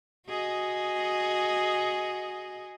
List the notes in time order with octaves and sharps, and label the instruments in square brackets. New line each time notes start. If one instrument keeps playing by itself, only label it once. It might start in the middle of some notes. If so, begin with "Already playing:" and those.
[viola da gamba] F#4 G#4 D#5